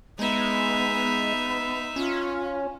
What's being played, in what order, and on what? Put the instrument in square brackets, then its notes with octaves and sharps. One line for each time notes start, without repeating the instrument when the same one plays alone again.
[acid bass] G#3 [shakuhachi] B3 [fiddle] D#4 E5
[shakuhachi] B3
[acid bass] C#4 [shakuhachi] F4